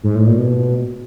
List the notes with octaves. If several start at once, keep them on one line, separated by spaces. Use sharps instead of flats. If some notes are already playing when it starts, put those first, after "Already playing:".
G#2
A2
A#2
B2